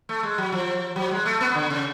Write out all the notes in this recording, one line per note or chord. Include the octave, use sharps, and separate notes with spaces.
A3
G#3
F#3
F3
F#3
G#3
A3
B3
D3
C#3